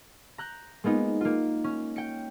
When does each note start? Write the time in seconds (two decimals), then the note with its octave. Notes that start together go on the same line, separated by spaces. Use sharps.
0.38 A#5 F#6 G6
0.84 G#3 A#3 B3 D#4 F4
1.21 A#3 F4
1.64 C#4
1.96 G5 C#7